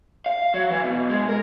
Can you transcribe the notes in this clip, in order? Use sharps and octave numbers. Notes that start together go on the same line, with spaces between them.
F5
F#3
E3
B2
G#3
A#4